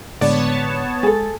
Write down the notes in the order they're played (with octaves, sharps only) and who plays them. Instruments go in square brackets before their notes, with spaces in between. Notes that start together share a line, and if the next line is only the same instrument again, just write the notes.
[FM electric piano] A2 D3 G#3 [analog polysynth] B3 C#5 A5 [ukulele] D5
[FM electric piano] G#3 A6 [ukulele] G#4 A4